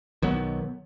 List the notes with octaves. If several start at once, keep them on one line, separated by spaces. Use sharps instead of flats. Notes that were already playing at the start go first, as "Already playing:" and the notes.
B1 D#3 F#3 B3